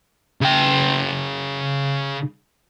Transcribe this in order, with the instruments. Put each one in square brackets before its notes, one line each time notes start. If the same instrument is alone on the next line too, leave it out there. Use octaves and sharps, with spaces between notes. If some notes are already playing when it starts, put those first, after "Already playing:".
[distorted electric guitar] C#3 G5